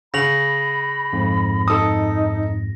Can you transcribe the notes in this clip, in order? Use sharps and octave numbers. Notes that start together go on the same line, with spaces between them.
C#3 B5 A#6 F7 F#7
F2 G#2
D#4 A4 D#6